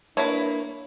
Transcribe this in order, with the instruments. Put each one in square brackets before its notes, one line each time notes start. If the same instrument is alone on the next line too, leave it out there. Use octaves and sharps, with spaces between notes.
[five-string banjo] A#3 E4 B4 [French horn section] D4 [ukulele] C#5